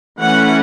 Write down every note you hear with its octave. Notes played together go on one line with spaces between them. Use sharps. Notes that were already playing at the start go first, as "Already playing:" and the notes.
E3 A3 C#4 F#5